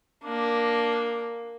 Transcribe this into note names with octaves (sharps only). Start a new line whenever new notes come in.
A#3 D4